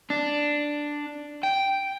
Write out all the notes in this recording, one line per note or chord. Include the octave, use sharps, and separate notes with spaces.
D4
G5